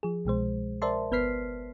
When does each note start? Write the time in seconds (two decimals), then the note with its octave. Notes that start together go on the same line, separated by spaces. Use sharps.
0.03 F3 G#4
0.25 C2 B2 G#3 C5
0.82 A#4 C5 D5 E5 A5 C6
1.11 G1 B3 B4 F6 B6 C7